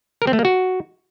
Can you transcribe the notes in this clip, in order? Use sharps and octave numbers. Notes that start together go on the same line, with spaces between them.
A#4
C4
A3
A#3
F#4